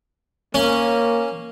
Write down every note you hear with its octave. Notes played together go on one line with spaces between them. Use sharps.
A#3 C#4